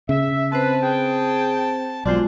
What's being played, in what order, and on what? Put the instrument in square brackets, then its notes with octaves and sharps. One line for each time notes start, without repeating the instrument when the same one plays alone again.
[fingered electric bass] C#3 [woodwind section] E5
[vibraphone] C4 C5 [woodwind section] B4 [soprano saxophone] A5
[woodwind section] G#4 G5
[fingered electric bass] B1 [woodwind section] D3 F#3 C5 [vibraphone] G#3 F4 F#4 [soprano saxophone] D5